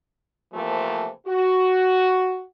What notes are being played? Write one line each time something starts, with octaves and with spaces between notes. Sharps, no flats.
C3 E3 F3 A3 A#3
F#4